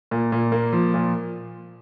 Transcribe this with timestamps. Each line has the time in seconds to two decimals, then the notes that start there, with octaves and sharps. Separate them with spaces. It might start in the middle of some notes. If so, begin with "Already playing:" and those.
0.11 A#2
0.32 A#2
0.52 A#3
0.73 F3
0.94 A#2